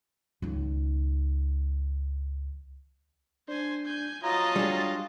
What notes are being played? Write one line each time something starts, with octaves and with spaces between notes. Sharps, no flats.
C#2 D#3
D4 C5 G#5
G#5 G6
F#3 F4 D#5 A5 A#5
G3 D4 G#4